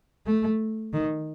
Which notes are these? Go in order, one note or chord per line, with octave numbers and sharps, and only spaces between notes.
A3
D#3